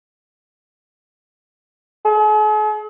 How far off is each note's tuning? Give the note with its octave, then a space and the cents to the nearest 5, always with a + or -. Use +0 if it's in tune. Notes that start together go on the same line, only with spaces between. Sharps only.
G#4 +45